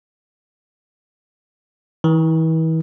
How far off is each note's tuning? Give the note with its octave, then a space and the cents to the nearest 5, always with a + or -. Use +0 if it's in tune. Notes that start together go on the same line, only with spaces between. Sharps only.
E3 -40